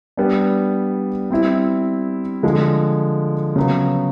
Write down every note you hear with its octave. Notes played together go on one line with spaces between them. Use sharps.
G3 B3 D4
G3 C4 E4
D3 F3 G#3
C#3 F#3 B3